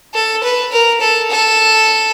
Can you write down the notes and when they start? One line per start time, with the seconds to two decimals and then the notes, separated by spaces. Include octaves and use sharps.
0.15 A4
0.44 B4
0.73 A#4
1.01 A4
1.31 A4